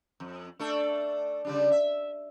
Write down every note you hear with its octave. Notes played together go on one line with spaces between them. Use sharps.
F2
A3 D4 A4
C#3 G3 D4
E5